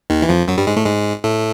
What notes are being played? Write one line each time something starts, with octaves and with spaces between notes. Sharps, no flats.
D#2 D#3
E3
F2 F3
F#2 F#3
G2 G3
G#2 G#3
A2 A3
G#2 G#3
A2 A3